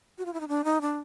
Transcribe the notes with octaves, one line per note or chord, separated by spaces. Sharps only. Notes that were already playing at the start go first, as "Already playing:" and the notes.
F#4
F4
E4
D#4
D4
D#4
D4